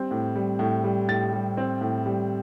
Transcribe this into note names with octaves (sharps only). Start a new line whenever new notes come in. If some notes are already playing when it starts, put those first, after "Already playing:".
Already playing: G3 C4
A2
G3
A2
G3
A2 A6
G3
C4
A2
G3